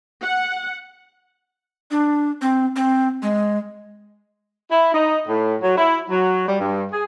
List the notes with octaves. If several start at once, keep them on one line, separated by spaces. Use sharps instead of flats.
F#5
D4
C4
C4
G#3
E4
D#4
A2
F#3
E4
F#3
G3
G2
G#4